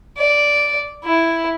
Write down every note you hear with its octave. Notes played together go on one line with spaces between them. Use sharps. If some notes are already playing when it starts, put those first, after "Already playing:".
D5
E4